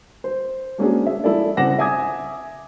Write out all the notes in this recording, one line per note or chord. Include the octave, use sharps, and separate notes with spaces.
C5
G#3 A#3 C#4 D4 F#4 G#4
E5
F3 G#3 E4 A4 D5
C#3 C4 F#5 D6 A#6 E7
E5 G#5 D6 D#6 G#6